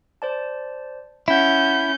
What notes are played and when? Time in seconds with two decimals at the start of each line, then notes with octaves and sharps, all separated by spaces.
0.22 C5 D5 A5
1.28 C#4 E4 E5 F#5 G6